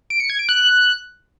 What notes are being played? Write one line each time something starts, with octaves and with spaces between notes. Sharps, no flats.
D7
C#7
G#6
D7
F#6